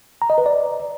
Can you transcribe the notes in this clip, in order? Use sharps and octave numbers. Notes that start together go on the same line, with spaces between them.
A#5
D#5
B4
D5